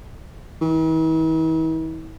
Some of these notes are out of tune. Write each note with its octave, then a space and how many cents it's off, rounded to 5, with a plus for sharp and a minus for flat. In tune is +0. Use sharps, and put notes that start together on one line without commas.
E3 -45